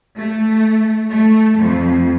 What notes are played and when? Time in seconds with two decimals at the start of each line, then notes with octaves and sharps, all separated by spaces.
0.19 A3
1.14 A3
1.60 F2